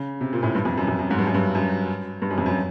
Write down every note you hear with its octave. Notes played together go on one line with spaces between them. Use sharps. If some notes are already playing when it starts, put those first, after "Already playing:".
Already playing: C#3
C3
A#2
A2
G2
F2
F#2
F2
F#2
G#2
G2
F#2
G2
F#2
G2
F#2
F2
F#2